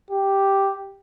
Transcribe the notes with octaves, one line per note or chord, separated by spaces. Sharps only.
G4